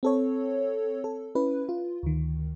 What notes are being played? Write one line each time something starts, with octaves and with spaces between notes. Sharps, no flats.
C4 A4 C#5
A4
C#4 E4 B4
F4
D2 D#3